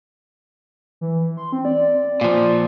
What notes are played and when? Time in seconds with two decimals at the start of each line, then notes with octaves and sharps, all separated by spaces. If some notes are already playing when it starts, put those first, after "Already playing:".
1.01 E3
1.37 C6
1.52 C4
1.65 D5
2.21 A#2 F3